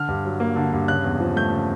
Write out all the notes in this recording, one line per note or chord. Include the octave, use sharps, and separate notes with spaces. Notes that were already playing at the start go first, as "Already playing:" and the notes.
Already playing: D3 F6
G2
F#3
A#3
D3
G2
C#3 F#6
E2
F3
A3 G6
C#3